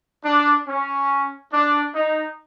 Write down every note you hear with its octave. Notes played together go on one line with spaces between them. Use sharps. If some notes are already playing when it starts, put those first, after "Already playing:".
D4
C#4
D4
D#4